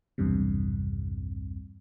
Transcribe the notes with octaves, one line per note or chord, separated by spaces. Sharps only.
B1 E2 G2 C3